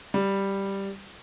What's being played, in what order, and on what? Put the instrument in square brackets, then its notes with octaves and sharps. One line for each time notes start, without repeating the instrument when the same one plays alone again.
[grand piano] G3